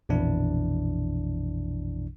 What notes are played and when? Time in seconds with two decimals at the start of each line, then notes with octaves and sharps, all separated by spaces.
0.09 A#1 F2 B2 E3 D4 E4